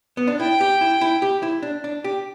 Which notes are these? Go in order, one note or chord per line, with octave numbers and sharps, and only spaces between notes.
B3
D4
E4 G5
G4
E4
E4
G4
E4
D4
D4
G4